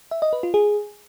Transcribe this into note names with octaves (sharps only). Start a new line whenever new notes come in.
E5
D#5
B4
F4
G#4